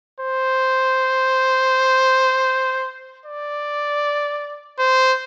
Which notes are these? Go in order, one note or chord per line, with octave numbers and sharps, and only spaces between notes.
C5
D5
C5